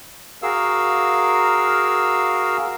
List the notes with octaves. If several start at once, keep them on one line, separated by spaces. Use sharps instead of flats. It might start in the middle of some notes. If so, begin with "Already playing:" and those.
F#4 G#4 A#4 F5 E6